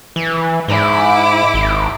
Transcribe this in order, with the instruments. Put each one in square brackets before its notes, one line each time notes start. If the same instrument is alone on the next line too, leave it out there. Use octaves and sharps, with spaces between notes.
[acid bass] E3
[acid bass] G#2 [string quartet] E4 D6
[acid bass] G#1